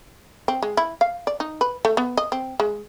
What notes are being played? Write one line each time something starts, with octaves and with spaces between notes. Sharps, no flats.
C4
G#3
E4
F5
D5
D#4
B4
A3
B3
D#5
C4
G#3